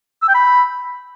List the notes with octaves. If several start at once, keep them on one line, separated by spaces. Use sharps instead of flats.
E6
G5
B5